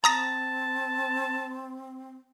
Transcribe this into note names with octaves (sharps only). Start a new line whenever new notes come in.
C4 A5 A#5 D#6 A#6